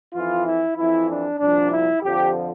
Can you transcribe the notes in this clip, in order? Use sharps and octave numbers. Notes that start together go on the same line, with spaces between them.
F2 E3 F4
E4
F2 E3 E4
D4
C2 A#2 F3 D4
E4
F2 D3 F3 G4